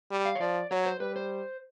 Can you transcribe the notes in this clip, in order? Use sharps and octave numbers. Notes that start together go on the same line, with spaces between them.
G3
F5
C#5
F3 D5
F#3 C#5
C5
G3 B4
C5